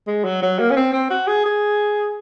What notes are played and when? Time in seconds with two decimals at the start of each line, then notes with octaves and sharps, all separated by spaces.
0.07 G#3
0.24 F#3
0.42 F#3
0.59 A#3
0.71 C#4
0.76 C4
0.93 C4
1.10 F#4
1.27 G#4
1.45 G#4